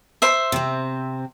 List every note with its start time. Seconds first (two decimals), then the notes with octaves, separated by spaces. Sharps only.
0.22 C5 E5
0.52 C3 C4